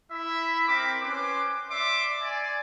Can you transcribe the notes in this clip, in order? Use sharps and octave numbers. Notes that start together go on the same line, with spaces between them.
E4 E5 B5
C4 A#4 B5 D6
C#4 B4 C5 D6
D5 E5 C6 D6
D5 G#5